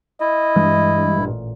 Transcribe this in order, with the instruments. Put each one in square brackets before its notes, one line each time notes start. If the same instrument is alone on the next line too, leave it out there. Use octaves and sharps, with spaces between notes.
[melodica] E4 [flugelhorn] D#5
[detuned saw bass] G2 [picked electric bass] E3 G#3
[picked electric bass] A1 A#2